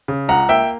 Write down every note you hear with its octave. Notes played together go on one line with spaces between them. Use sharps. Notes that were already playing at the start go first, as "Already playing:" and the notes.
C#3
C#2 F#5 A#5
A#3 E5 G5